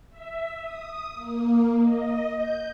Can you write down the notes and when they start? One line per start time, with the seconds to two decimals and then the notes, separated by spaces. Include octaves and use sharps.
0.10 E5
0.62 D#6
1.13 A#3
1.82 D#5
2.36 G6